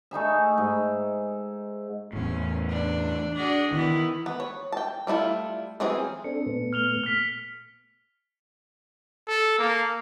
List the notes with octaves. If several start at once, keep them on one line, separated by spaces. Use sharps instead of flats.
A3 D#4 G#4 E5
G#2
E2 A2 C#4
D4
D4 F#4 G#4
D#3 E3 B3 E4
B3
C#5
G5 A5
G3 A3 E4 F4
E3 F#3 C4 C#4 G#4
C4 D4 A4 C#7
A#2 A3 B3
F6 F7 G7
F6 B6
A4
A#3